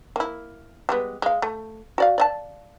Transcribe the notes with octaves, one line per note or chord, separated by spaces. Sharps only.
A#3 E4
G3 G#3 B3
G#3 F5
A3
F#4 D5 F5
D5 D#5 A5